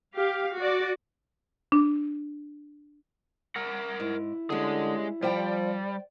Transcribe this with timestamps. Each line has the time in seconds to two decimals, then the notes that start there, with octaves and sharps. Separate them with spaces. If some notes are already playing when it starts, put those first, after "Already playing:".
0.15 G4 F5
0.57 F#4 D5
1.72 D4
3.56 A#4 F#5
4.00 G#2 E4
4.50 D3 G3 G#3 C#4 G#4
5.22 F3 G3 C5 D5 G5